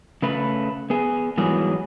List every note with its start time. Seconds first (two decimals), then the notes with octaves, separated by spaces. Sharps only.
0.22 C#3 A3 B4
0.90 B3 G#4
1.37 G#2 E3 F#3 G3 B3 G#4